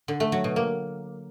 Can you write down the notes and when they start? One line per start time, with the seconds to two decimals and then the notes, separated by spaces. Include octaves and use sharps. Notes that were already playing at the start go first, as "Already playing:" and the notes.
0.08 D3
0.20 A3
0.32 F#3
0.44 B2
0.56 A#3